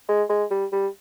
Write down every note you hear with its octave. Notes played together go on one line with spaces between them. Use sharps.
G#3
G#3
G3
G3